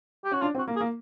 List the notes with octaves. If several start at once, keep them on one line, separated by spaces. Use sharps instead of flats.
G4
C#4 F#4
D4 F4
C4
F#4
A#3
G#4
A#3